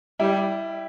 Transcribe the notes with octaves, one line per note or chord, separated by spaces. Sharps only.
G3 E4 G4